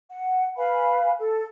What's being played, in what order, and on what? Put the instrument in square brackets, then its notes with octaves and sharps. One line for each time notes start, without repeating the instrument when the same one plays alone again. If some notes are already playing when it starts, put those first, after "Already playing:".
[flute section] F#5
B4 F5 G#5 B5
A4